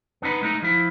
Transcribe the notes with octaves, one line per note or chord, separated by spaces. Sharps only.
B3 D4 D#4 B4
G#3 A3 D#4
F3 E4